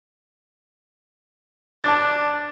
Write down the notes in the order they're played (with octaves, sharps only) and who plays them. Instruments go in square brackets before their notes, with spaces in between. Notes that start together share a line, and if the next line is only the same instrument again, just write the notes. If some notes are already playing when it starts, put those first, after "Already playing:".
[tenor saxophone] D4 [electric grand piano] A5 D6 A6